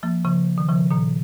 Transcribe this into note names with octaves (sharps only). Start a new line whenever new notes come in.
F3 A#3
C#3 F3
D#3
C#3 F3
A#2 D#3